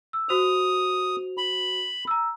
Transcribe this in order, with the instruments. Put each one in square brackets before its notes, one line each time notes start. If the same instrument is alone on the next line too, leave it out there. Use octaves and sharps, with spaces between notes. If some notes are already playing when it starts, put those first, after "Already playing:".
[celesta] E6
[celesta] F#4 C5 F7 [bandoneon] D#6
[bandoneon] B5
[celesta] A#5 E6